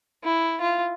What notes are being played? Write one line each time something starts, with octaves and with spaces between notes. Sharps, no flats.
E4
F4